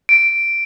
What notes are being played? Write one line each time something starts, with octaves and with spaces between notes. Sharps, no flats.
D7